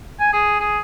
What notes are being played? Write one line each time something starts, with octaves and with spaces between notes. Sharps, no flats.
G#5
G#4
G#4